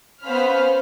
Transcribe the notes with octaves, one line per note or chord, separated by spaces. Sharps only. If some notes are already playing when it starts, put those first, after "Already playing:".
B3 C#4 C5 F5 B5 F6